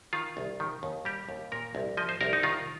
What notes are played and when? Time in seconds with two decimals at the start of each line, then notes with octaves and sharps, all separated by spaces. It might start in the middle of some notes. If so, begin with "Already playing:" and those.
0.13 D#3 F4
0.37 C2
0.60 D#3
0.83 D#2
1.05 G3 G4
1.29 D#2
1.52 A#2 A#4
1.75 C2
1.97 F3 D#5
2.09 C5
2.21 C2 A#4
2.33 D#4
2.43 D#3 F4